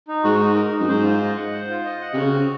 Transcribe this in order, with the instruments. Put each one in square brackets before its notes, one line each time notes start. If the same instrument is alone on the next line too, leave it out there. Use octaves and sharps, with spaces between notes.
[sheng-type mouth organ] D#4
[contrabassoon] G#2 [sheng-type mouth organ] F#4
[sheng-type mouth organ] D#4
A#4
D#4
[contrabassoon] F#2
[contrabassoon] G#2 [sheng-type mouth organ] C5
[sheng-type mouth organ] F4
D#5
F#5
C5
F4
D#5
F#5
[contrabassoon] C3
[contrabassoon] C#3 [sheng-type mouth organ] F#4
[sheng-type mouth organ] C4